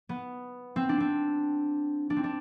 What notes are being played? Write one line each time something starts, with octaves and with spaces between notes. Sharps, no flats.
B3
C4
D4
C4
D4
C4
D4